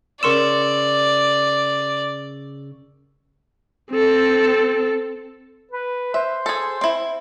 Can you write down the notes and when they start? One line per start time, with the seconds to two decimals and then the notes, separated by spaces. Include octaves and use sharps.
0.23 C#3 A#4 D5 C6 C#6 E6 E7
3.91 C4 A4
5.71 B4
6.14 C5 E5
6.46 G#4 A4
6.81 C4 E4